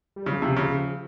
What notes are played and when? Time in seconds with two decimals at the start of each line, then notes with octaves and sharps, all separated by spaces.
0.16 G3
0.26 C#3 F3
0.42 C3
0.57 C#3